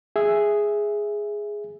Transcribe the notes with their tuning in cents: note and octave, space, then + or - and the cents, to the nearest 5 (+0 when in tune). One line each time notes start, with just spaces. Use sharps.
G#4 +0 E5 +0